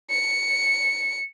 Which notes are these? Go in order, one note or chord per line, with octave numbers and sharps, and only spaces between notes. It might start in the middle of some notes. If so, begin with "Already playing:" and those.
C#7